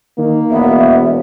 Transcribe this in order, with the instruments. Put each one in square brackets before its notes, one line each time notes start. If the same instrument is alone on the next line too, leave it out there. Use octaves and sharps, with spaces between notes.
[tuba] D#3 [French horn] A#3
[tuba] E1 [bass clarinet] B3 [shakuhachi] E5